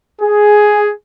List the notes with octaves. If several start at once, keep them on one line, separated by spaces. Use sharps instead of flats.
G#4